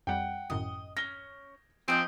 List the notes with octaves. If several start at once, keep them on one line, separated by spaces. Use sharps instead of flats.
F2 G3 F#5 G5
G#1 F#2 A2 D#5
C#4 A#6 G7
F3 A#3 C4 D#5 G#5 G6